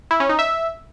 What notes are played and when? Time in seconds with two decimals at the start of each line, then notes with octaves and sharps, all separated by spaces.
0.11 E4
0.20 C#4
0.29 D#4
0.39 E5